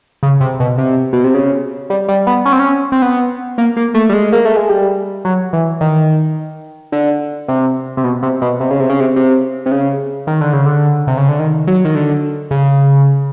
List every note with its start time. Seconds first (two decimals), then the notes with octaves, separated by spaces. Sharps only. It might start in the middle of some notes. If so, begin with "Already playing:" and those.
0.23 C#3
0.40 C3
0.60 B2
0.78 C3
1.13 B2
1.24 C3
1.34 C#3
1.90 G3
2.08 G3
2.27 B3
2.46 C#4
2.52 C4
2.60 C#4
2.92 C4
3.02 B3
3.58 A#3
3.77 A#3
3.94 A3
4.09 G3
4.13 G#3
4.33 A#3
4.45 A3
4.57 G#3
4.69 G3
5.25 F#3
5.53 E3
5.81 D#3
6.92 D3
7.48 C3
7.97 C3
8.04 B2
8.23 C3
8.42 B2
8.60 C3
8.71 C#3
8.80 C3
8.90 C#3
9.00 C3
9.16 C3
9.66 C3
9.71 C#3
10.27 D#3
10.41 D3
10.53 C#3
10.66 D3
11.07 C3
11.17 C#3
11.29 D3
11.39 D#3
11.67 F#3
11.85 D#3
11.95 D3
12.51 C#3